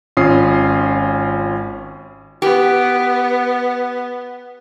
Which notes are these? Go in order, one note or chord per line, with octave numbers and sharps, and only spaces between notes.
G#1 C#4 F4 D#6 C7
B3 G4